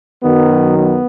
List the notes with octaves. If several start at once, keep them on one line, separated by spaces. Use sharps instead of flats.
F#2 D#3 F#3 B3
B3